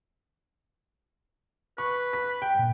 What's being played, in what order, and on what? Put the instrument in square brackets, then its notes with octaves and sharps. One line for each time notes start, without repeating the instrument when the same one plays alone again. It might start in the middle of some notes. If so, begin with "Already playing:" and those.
[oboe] B4 [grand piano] C#6
[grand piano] B6
G5
[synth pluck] G2 A#2